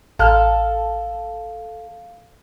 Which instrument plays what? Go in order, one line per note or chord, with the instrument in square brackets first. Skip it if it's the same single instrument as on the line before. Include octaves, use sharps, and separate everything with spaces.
[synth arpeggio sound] A1 F6 [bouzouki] A4 [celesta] F5